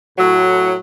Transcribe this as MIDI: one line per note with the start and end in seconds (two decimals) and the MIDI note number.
0.18 0.75 45
0.18 0.75 54